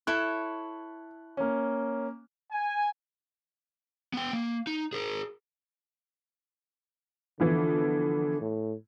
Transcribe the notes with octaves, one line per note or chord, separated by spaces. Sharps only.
E4 A4 C#5 F#6
A#3 C#4
G#5
B3 G5
A#3
D#4
G#4 A#4
D3 E3 F3 B3
A2